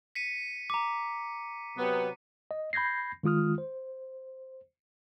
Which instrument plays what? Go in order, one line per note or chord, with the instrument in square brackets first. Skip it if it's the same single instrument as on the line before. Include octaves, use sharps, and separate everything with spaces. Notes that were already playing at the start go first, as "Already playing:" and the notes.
[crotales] B6 C#7 D#7
[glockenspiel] A#5 D6
[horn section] C3 F#3 B3
[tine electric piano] D#5
B5 G6 G#6 A#6 C7
D#3 G#3 F4 D#6 F6
C5